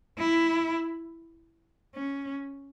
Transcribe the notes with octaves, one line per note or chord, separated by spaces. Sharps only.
E4
C#4